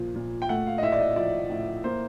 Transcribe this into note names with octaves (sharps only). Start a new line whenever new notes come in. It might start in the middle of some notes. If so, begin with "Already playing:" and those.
Already playing: A#2 F3
A#2
G5
A3 F#5
F5
D#5
A2 E5
D5
D#5
F3 D5
A2
A#3 C5